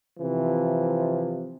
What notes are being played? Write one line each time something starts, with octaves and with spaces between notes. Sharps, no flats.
C3 E3 F3